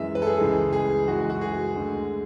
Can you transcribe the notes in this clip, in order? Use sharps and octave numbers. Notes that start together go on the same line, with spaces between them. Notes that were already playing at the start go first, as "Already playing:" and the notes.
Already playing: F#2 E3 G#3 E5
B4
A4
G#4
C#2 C#3 E3 G#3
G#4
F#2 E3 G#3 F#4
F#4
G#4
D2 D3 G#3